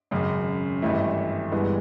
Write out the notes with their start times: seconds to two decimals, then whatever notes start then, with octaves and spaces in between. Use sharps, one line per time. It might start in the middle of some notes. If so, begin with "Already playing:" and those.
0.11 G#1 F#2 C#3
0.82 G#1 G2 E3 A3
1.52 G1 G2 E3 G#3 B3